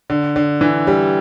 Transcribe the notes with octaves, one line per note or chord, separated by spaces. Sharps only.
D3
D3
E3
G3